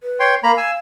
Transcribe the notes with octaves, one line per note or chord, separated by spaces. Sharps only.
B4
C#5 G5 C6
A#3 F5 A#5 B5
G#5 E6